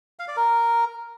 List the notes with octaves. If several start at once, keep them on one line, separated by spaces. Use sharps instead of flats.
F5
D5
A#4